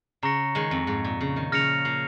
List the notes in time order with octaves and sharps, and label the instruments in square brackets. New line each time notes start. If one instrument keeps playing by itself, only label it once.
[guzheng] C#3 [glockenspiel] A#5 C#6 A#6 C#7
[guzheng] D#3 G#3
F2
G#2
A#2
C#3
D#3
[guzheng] C#3 F3 [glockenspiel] F6 A#6 C#7 F7
[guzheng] F3 A#3